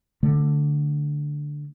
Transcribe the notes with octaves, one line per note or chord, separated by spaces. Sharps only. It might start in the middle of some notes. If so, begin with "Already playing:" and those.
D3 A3